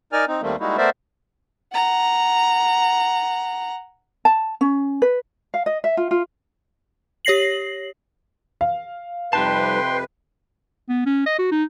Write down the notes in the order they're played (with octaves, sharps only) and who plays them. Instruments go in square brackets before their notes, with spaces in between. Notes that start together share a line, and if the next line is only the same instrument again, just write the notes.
[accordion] D#4 A#4 D5 G#5 F6
C4 D#4
D#2 D#3 G3 A3 A#3 C4
G3 G#3 A#3 D#4 E4 F#4
A3 B3 A#4 C5 D5 E5
[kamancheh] F#5 A#5
[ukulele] A5
C#4
B4
F5
D#5
E5
F4
F4
[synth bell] G4 C#5 A#6 C7 F#7
[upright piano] F5
[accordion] F2 C3 B4 [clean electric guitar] G3 D#4 A5 [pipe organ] G5 C6
[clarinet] B3
C#4
D#5
F#4
D#4